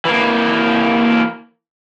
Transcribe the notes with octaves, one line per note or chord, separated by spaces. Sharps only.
E3 A#3